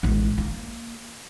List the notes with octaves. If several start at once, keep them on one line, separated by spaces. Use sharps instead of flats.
A1 G#3
A#3